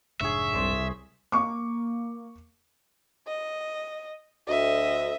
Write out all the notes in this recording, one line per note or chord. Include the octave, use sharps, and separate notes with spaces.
F1 G#2 D4 G#4 C#5 E5
C2 C5 D5
A#3 C#6 D6
D#5
D2 D#5 E5